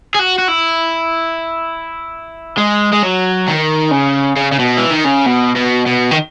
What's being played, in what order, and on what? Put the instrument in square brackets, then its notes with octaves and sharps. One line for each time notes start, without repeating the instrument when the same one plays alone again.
[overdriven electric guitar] G#4
F#4
F#4
E4
G#3
G#3
F#3
D#3
C#3
C#3
C#3
B2
E3
D#3
C#3
B2
B2
B2
D#3